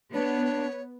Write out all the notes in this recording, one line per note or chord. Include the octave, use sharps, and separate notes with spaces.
B3 D4 C#5